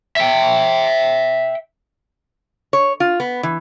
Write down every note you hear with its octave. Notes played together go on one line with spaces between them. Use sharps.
E5 G5
C#5
F4
B3
E3